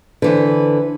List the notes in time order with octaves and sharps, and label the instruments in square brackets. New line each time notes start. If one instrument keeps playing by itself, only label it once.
[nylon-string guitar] D3 C5 [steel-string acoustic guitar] E3 B4